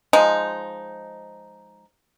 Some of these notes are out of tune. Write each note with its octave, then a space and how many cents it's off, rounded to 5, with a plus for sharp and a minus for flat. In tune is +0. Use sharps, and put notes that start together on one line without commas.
F3 +0 G#3 +0 D#4 +0